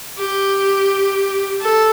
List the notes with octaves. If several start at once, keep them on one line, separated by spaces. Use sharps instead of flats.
G4
A4